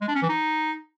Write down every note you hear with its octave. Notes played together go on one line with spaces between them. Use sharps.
G#3
D4
C#4
E3
D#4